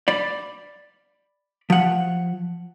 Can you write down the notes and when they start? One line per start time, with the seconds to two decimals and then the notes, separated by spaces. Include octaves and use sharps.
0.08 D5 B5
1.70 F3 F#5